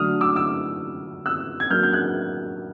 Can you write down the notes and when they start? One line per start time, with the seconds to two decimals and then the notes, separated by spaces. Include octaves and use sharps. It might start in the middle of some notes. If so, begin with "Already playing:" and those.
Already playing: D3 F#3 A3 D#6 F6
0.21 D6 E6
0.36 D6 E6
1.26 E6 F#6
1.60 G#6
1.70 F#3 A#3 D4 F6 G6
1.83 G6
1.93 F#6 G#6